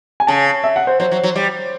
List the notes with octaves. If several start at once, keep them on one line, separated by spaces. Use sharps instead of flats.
G#5
C#3 A5
E5
F#5
C5
F#3 C5
F#3
F#3
G3